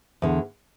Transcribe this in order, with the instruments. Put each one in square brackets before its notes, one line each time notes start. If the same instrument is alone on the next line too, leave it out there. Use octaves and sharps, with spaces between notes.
[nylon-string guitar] E2 D3